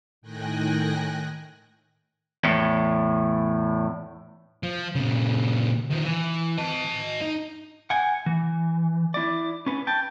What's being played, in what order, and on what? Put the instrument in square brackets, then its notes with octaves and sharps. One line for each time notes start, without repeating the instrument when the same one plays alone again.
[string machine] A2 D#3 G5 G#5 F#6 A#6
[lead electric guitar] E2 A2
[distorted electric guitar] F3
A#2 C#3
D#3 F3
E3
D#5 A5
D#4
[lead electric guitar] F#5 G#5
E3
E4 D5
C#4 B4
G5 A5